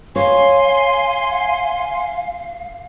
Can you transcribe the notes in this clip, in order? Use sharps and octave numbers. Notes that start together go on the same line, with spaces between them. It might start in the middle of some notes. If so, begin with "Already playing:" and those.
C#5 F5 G#5 C6